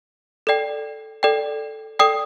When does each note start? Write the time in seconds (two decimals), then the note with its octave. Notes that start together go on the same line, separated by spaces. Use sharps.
0.47 A4 D5 G5
1.23 A4 D5 G5
1.99 A4 D5 G5 D#6